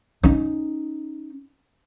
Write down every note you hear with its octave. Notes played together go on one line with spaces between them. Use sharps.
C#4 D#4